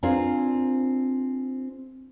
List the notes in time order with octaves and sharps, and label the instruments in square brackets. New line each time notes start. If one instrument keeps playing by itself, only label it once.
[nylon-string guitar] C4 D4 F4 G#4 A#4